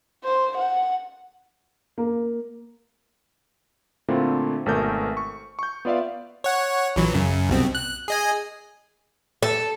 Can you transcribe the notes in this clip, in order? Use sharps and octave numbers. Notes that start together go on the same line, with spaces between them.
C5
F#5
A#3
A#2 D3 A3 C4 E4 F4
G#1 B2 A3 A#4 G6
C#6
C#6 G6
B3 F4 D5 E5 F5
C#5 F#5
A#1 E3 F#3
F#2 C#3
C2 B2 C4
F#6
G#4 D#5 G#5
A4